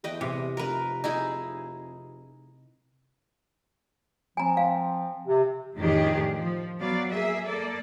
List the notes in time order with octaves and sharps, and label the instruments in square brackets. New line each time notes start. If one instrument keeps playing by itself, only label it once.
[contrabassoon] E2 [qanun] B4 D#5 G5
[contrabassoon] E2 [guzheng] C3
[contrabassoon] F1 [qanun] A#4 B4
[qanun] D#4 E4 G#4
[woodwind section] F3 C4 [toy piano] G#5 A#5
[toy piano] F5
[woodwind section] C3
[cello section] F2 A2 D#3 D4 G4 G#4
F3
F#3 B3 D5 F5
A#3 G#4 E5
A#3 A4 D5